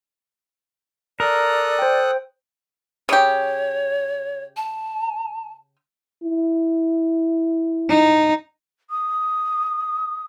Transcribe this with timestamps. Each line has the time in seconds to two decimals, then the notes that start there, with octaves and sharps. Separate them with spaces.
1.20 A4 A#4 D5 D#6 F#6
1.79 C5 G5
3.09 C#3 G4 C#5
4.56 A5
6.24 E4
7.89 D#4
8.90 D#6